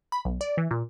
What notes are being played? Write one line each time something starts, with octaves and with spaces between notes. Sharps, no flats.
B5
B1
D5
E3
A#2